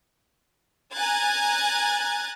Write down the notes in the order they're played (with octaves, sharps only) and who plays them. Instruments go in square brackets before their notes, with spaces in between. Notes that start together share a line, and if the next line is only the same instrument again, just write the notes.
[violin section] G#5 A#5 F#6 G#6 A6